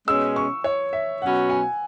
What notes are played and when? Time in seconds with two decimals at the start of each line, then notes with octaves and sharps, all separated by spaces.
0.07 B2 G#3 C#4 E6
0.36 C#6
0.64 C#5
0.93 E5
1.22 B2 F#3 C#4 F#4 B4 F#5
1.50 G#5